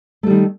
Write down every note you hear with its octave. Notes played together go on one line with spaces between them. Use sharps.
D#3 G3 A3